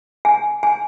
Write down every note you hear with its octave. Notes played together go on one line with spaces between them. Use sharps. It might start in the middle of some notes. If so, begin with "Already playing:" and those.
G#5
G#5